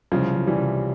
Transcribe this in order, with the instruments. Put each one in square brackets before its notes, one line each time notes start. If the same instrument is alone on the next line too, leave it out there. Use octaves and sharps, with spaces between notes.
[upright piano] C2 [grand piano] C#3 F3
[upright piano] C2
[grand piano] E3 G3
[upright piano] C3